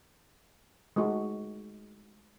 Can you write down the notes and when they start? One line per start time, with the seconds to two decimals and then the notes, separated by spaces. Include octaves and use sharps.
0.96 G#3 A3 D#4 F#4